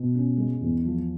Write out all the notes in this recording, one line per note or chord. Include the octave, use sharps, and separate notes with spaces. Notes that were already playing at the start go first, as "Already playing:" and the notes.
Already playing: B2
C#4
G#3
E2
F3